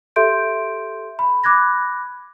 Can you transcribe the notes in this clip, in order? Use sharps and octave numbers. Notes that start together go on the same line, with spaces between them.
G4 A4 E5 C6 G6 D7
B5
B5 D6 F#6 G#6 A#6